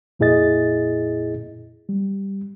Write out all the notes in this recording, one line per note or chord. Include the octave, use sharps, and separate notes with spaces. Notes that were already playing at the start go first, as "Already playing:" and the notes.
F2 A#2 E4 G#4 D#5 A6
G3